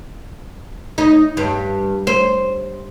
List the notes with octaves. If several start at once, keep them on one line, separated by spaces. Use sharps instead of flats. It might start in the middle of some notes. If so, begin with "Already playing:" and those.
D#4
G2
C5